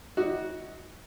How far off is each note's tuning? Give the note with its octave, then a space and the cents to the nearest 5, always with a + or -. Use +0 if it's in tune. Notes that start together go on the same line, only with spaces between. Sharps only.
D#4 +40 F#4 +0 D5 +25